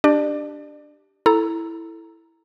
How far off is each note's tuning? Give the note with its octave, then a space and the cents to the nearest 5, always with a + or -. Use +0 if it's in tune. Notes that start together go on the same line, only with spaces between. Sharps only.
D4 +0 G4 +0 D5 +35
E4 +0 A4 +0 A#5 +0